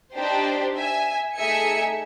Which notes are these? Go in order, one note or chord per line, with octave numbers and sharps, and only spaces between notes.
D4 D#4 G4 C5
E5 G#5
A3 D#4 G#4 E5 G#5 C#7